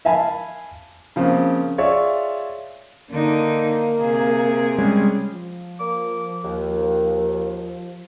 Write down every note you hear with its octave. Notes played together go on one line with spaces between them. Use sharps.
E5 F5 G#5 A5 B5
C#3 F3 A#3 C4
F4 G#4 C#5 D5 E5
D3 A#3 D#4
C3 G#4
G3 G#3 C#4
F3
A#3 D6
D#2